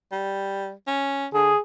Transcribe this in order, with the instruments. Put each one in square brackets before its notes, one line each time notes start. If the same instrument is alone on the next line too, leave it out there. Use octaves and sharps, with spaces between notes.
[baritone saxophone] G3
C#4
[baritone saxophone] D3 [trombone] G#4